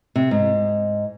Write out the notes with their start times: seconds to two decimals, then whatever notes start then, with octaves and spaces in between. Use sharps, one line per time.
0.16 C3
0.31 G#2